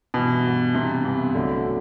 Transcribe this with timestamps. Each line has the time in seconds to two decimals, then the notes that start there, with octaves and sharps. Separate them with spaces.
0.14 G2 B2 E3 B3
0.44 G2 E3 B3
0.74 G2 C3 E3 B3
1.04 G2 E3 B3
1.35 B1 B2 D3 A3
1.65 B2